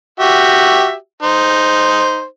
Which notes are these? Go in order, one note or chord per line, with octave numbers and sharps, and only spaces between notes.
F#4 G4 E5
D#4 C5